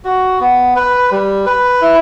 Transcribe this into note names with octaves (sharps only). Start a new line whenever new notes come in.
F#4
B3
B4
G3
B4
E4